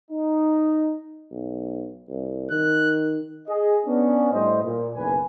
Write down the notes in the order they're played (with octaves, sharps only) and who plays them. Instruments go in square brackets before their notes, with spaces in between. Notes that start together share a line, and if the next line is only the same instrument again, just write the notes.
[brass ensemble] D#4
[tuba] B1
C2
[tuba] D#3 [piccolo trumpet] F#6
[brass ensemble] G#4 D#5
B3 C#4 D4
A2 G3 C5 D#5
A#2
F#1 B1 C#3 B4 G#5